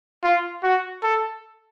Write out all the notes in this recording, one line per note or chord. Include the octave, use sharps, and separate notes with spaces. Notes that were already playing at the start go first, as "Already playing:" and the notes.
F4
F#4
A4